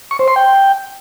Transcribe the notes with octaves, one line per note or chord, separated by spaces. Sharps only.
C#6
C5
C6
G5